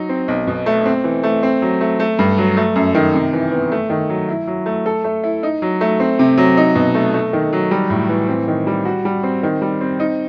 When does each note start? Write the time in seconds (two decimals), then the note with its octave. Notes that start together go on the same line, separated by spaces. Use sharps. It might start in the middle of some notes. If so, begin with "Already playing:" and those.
Already playing: F#3 D#4
0.09 C4
0.28 B1
0.47 B2
0.66 A3
0.86 C4
1.04 E3
1.23 A3
1.43 C4
1.62 F#3
1.81 A3
2.00 A3
2.19 G2
2.38 F#3
2.57 A3
2.75 F#2
2.95 D#3
3.14 C3
3.33 E3
3.52 B3
3.72 A3
3.90 D#3
4.09 F#3
4.28 E4
4.47 F#3
4.66 A3
4.86 A4
5.04 A3
5.24 E4
5.43 D#4
5.62 F#3
5.81 A3
6.00 C4
6.19 C3
6.38 F#3
6.57 D#4
6.75 B2
6.95 A3
7.14 A3
7.33 D#3
7.53 F#3
7.71 G3
7.90 A2
8.09 E3
8.28 C4
8.48 D#3
8.67 G3
8.85 F#4
9.05 G3
9.23 C4
9.43 D#3
9.62 G3
9.81 C4
10.00 D#4